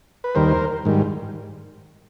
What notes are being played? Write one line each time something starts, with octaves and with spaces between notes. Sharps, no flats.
B4
D#2 D#3 G3 A#4 C5
G#2 D#3 G3